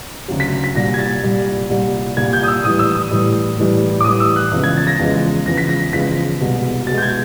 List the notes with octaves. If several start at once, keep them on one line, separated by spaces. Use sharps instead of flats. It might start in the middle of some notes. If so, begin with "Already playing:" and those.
D2 C#3 F#3
B6
B6
C2 A#2 G3 A#6
G#6
A6
C2 A#2 G3
C2 A#2 G3
C2 A#2 G3 G#6
G6
D#6
E6
A2 E3 G3 D#6
E6
D#6
A2 E3 G3
A2 E3 G3
D6
A2 E3 G3 D#6
E6
F#6
E2 C#3 F3 G#3
G#6
A6
A#6
E2 C#3 F3 G#3
E2 C#3 F3 G#3 A#6
B6
A#6
E2 C#3 F3 G#3 B6
C2 B2 G#3
C2 B2 G#3 A6
G6
G#6